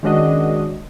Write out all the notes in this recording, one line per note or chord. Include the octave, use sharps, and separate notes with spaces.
D#3 G#3 C#4 D4 F#4 D#5